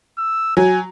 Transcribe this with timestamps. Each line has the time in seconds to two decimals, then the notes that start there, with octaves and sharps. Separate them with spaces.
0.18 E6
0.57 F#3 G#5